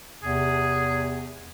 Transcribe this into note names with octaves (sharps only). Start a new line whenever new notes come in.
E2 C3 G#4